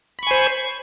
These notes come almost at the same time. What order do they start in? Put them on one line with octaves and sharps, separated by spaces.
B5 C#6 G#5 C5